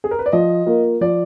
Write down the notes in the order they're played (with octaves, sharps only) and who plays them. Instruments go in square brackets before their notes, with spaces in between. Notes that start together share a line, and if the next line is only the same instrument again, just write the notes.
[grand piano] G#4
A#4
B4
D5
[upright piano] F3 [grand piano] D#5
[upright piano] A#3 F4
[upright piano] F3 [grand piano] D5